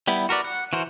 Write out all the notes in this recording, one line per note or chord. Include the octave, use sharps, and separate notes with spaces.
G3 B3 E4
F#4 A#4 B4 D5
F#5
E3 F#4 A#4 C5